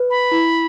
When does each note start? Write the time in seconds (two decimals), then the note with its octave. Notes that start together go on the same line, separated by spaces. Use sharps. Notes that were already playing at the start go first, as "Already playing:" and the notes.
Already playing: B4
0.10 B5
0.32 E4